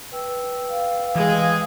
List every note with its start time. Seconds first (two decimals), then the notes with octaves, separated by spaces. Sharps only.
0.12 B4 G5 E6
0.70 F5
1.15 E3 G#3 G#4